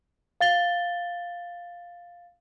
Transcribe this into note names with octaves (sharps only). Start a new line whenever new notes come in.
F5 A6 G7